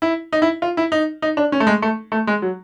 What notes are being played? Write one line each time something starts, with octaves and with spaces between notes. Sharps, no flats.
E4
D#4
E4
F4
E4
D#4
D#4
D4
C#4
A3
G#3
A3
A3
G#3
F#3